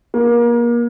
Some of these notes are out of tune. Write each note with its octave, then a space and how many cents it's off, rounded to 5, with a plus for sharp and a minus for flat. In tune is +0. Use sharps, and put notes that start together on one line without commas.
A#3 +30